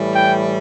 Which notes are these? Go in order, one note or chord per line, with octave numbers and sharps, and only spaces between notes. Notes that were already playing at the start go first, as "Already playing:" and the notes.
Already playing: A2 E3 G3
G5